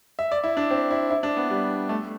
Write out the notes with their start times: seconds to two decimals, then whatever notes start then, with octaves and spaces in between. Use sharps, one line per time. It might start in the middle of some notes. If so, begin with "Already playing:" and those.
0.19 E5
0.31 D5
0.44 E4
0.57 D4
0.71 C4
0.91 E4
1.11 E4
1.23 D4
1.37 B3
1.50 G3
1.89 A3